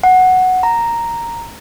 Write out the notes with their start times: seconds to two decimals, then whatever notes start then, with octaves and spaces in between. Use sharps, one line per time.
0.04 F#5
0.63 A#5